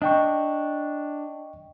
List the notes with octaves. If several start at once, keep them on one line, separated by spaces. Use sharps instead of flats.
D4 D#5 G5 C#6